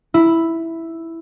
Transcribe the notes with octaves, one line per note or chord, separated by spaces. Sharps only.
E4